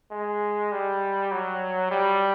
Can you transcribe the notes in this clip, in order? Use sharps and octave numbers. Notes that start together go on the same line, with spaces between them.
G#3
G3
F#3
G3